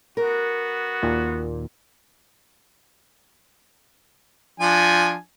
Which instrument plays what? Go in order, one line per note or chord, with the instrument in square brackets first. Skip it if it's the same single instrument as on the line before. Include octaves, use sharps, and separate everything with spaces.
[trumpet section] B3 F#4 [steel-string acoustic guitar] A#4
[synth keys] D#2 A#2
[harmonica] F3 D4 G#5